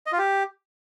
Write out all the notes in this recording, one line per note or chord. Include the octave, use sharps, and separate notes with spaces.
D#5
F4
G4